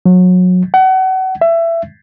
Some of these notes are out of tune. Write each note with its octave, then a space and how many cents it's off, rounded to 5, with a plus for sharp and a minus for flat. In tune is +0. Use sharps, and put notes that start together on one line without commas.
F#3 -25
F#5 +30
E5 +20